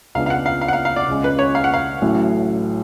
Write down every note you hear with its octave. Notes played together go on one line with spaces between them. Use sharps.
C#2 C#3 G#3 B3 D4 F5
F5
F#5
F5
F5
F#5
F5
F5
D5
C#2 C#3 G#3 C#4
B4
C#5
F5
F#5
F5
A1 A2 F#3